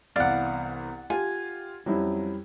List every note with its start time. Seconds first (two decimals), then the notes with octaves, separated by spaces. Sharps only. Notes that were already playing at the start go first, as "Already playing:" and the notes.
0.16 C2 E3 B3 D5 F5 F#5
1.10 F4 G4 G#5
1.86 F2 F#3 G3 C#4 E4